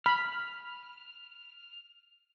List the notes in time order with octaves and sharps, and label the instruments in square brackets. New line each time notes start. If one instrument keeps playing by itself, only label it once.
[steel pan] B5 [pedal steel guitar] F6